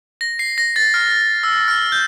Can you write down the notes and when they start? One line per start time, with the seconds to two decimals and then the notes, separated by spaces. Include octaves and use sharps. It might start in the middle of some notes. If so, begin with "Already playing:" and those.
0.21 A#6
0.39 C7
0.58 A#6
0.76 A6
0.94 F6
1.43 E6
1.68 F6
1.92 G6